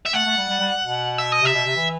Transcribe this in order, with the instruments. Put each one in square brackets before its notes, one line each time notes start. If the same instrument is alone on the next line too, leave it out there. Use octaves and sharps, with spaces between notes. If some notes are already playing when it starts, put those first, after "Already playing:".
[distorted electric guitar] E5
[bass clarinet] A3 [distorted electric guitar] F#5
[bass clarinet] A3
G3
G3
G3
B2
[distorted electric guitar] E5
D#5
[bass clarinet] C3 [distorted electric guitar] E5
[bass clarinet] B2
C3
E3